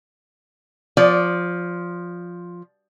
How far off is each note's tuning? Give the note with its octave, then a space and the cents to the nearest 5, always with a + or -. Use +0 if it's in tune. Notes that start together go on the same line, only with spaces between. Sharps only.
F3 +5 D5 -20